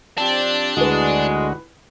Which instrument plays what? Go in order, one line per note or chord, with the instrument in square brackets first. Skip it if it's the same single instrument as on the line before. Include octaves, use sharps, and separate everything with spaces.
[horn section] F3 C4 G4 [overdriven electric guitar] D4
[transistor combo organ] D2 F#4 [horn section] G#3 [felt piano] E4 B4